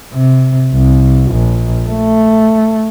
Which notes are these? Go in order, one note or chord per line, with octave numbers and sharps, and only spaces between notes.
C3
C2
A#1
A3